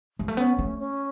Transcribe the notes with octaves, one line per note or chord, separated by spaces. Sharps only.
G#3
A3
B3 C#4
A3
C#4